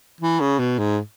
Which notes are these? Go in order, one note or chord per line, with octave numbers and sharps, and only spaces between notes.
E3
C#3
B2
G#2